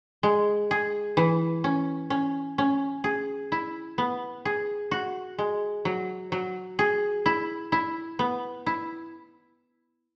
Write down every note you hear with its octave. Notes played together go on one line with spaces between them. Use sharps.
G#3
G#4
E3
C#4
C#4
C#4
G#4
E4
B3
G#4
F#4
G#3
F#3
F#3
G#4
E4
E4
B3
E4